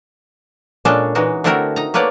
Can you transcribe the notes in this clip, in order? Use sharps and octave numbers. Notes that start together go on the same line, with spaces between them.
A#2 G#3 C#4 D4 A4
E3 G#3 D#4 F#4
D3 A3 C4 E4 F#4 A#4
D#4 A#5
A3 A#3 B4 C#5 D5 F#5